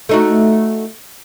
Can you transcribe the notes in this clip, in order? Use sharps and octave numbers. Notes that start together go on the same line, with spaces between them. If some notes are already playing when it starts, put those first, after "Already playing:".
A3 D#4 F#4